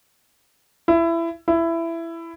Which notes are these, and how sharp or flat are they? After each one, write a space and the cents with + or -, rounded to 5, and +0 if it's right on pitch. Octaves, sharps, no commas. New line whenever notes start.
E4 +20
E4 +15